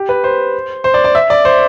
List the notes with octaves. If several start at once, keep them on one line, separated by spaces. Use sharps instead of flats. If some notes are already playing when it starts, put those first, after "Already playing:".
Already playing: G4
B4
C5
C5
D5
D5
E5
D5
C5